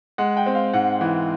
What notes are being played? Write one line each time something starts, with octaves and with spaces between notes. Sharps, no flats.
G#3 F#5
G5
C4
F5
G#2 F#5
E3